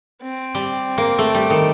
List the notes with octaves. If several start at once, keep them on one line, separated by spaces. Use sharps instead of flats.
C4
G3
A#3
A3
G3
D#3